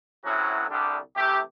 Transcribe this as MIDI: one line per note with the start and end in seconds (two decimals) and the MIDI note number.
0.24 0.65 45
0.24 0.65 48
0.24 0.65 54
0.24 0.65 61
0.24 0.65 64
0.24 0.65 66
0.68 0.97 36
0.68 0.97 50
0.68 0.97 55
0.68 0.97 62
1.15 1.40 48
1.15 1.40 52
1.15 1.40 57
1.15 1.40 67